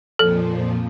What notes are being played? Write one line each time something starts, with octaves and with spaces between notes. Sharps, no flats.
F2 A#2 F3 A4